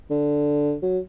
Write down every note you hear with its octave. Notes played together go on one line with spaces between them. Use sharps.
D3
F#3